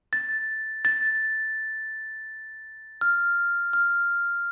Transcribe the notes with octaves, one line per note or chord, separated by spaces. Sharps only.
A6
A6
F6
F6